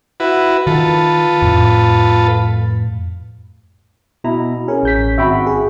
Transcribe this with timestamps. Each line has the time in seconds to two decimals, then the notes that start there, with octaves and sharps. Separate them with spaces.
0.20 E4 F#4 B4
0.67 D#3 F4 A4 B4
1.42 F2 A2
4.24 B2 E4 A#5
4.68 C#4 G#4 A#4
4.83 A1 G6 B6
5.18 G#1 F#4 E5 G5 B5
5.47 G#4